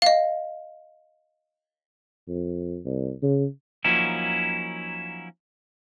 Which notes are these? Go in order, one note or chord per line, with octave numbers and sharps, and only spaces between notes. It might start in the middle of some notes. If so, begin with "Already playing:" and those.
D#5 F5
F2
C2
C#3
F3 F#3 A#3 C#4 D#4 E4